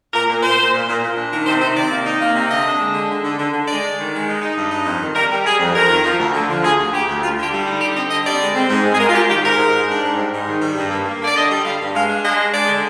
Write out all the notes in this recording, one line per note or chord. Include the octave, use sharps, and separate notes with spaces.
A#2 A#4
A#2
A#2 C5
A#2
A#2
A#2
A#2
D4
D#3 A#4
C3 C5
D#3 C5
C3 D5
A#3
D#4
A#3
C3
D3 D#5
D4
G#3
D3
D3
D3
D3
D3
G#3 D5
G#3
D#3
G#3
D#4
D#4
G2
D#4
F2
D#3
G3 A#4
G3
G3 G#4
F2
F2 A#4
D#3
F3
D2
D3
F3
D2 G#4
D2
D2 G4
D2
G3 F4
D3
G4
G3
D#4
D3 G4
C4 D#5
D3 D#5
G3 D5
G#3
C4
G#2
G#3
G#4
G#3 A#4
F4
G#3 G4
D#3 G4
G#2 A#4
G#2
G#2
D4
G#2
G3
G#2
D#3
G3
G2
A#3
A#3
D3 D5
D3 D#5
G3
G3 F5
G2
G#3 F5
D4
G#3 D#5
D4
G#3 D5
D3